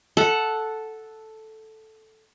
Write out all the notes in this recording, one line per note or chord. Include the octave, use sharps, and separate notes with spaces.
A4 F#5